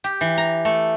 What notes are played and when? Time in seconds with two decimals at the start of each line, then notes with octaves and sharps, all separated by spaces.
0.04 G4
0.21 E3
0.38 A#5
0.65 A3